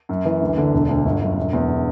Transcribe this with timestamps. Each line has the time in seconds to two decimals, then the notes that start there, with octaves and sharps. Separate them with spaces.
0.09 F#2
0.25 E3
0.41 D2
0.57 D3
0.73 E1
0.89 D2
1.05 G1
1.21 F#2
1.37 E1
1.53 E2